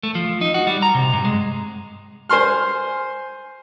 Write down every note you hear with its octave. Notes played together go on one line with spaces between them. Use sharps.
A3
F3
D#4
F#4
G3
A#5
C3
G2
G#3
C5 G#5 C6 F6